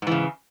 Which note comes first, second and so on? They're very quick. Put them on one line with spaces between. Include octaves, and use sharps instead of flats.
G#2 E3 C#3